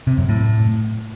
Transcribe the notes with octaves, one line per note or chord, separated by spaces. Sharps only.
C3
F#2
A2